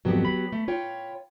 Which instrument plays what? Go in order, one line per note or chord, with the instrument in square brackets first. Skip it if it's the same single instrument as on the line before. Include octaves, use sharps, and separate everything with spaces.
[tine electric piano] G#1 F2 [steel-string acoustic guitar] F#3 B3 G4
[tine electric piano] B5
[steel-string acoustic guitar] A3
F4 C#5 G5